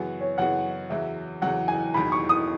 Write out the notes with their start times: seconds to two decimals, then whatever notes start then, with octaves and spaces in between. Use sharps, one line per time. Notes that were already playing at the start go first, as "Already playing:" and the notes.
Already playing: F#2 C#3 E3 B3 F#4 G#5
0.21 C#5
0.38 F#2 C#3 E3 B3 F#4 F#5
0.90 E2 C#3 F#3 E5
1.42 E2 C#3 F#3 F#5
1.68 G#5
1.94 E1 D#2 D#3 F#3 B5
2.12 C#6
2.29 D#6